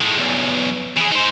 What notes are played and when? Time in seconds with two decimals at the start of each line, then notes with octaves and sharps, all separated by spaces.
0.01 A2 G#3
0.18 B1 E2
0.96 E3 G#4
1.11 D#4 C5